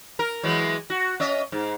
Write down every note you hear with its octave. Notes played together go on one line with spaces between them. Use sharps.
A#4
E3 F#3 G#3
F#4
C#4 D#5 E5
G#2